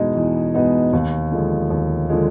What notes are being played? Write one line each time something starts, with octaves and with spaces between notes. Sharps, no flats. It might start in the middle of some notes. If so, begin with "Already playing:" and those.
Already playing: E2 B2 G#3 B3 D#4
E2
B2 G#3 B3 D#4
D#2
D3 F3 G#3
D#2
D3 F3 G#3